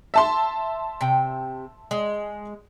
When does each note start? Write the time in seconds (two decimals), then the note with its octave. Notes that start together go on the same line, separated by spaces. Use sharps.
0.14 E5 A5 C6
1.01 C3 G5
1.91 G#3